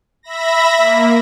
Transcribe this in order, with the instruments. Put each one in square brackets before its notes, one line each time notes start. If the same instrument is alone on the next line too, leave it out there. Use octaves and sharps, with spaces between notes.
[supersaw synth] E5 B5 A#6
[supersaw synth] A#3 [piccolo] E5